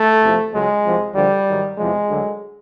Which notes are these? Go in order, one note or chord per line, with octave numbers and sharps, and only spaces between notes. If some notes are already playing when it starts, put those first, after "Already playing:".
Already playing: A3
E2 C3 F3
C#2 C#3 F#3 G#3
C2 C3 F3
D2 D3 F3 G3
G#2 D#3 F#3
E2 C3 F3 G#3
D2 D3 F#3